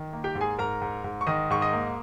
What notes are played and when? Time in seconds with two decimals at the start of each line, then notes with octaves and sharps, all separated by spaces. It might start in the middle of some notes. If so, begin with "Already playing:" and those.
Already playing: D#3
0.13 A#3
0.24 G4 G5
0.35 G#2
0.41 G#4 G#5
0.59 G#2 A#4 A#5
0.82 G#2
1.04 G#2
1.21 C#6
1.27 D#3 D#5 D#6
1.50 G#2 C#6
1.61 D#5 D#6
1.73 A#3